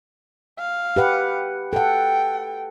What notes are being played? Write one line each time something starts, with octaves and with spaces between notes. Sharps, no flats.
F5
G4 B4 F#5
A4 F#5 G5